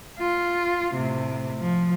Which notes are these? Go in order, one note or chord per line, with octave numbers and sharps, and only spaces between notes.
F4
A2 C3
F3